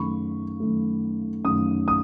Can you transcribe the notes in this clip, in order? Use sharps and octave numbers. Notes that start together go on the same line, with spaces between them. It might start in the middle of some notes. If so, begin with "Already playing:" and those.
Already playing: F#2 D#3 A3 B5 C#6
F#2 D#3 A3
F#2 D#3 A3 D#6
D#6